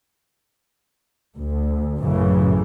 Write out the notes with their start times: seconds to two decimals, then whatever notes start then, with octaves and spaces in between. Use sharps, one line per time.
1.37 D2
2.02 A1 F#2 C#3 E3